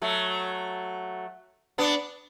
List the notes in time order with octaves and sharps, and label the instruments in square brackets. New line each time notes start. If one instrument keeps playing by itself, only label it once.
[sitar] F#3 A3
B3 D4